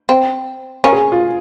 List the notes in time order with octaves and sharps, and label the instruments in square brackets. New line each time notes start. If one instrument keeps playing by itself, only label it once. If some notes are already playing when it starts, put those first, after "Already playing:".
[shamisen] C4
[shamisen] C#4 [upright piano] A#4
[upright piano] G#4
F4